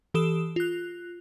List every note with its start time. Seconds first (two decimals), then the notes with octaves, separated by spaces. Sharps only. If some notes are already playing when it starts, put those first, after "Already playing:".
0.14 E3 G4 A4 D#6 E7
0.56 F4 F#6